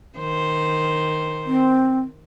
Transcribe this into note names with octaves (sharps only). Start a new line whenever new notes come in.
D#3 C5
C4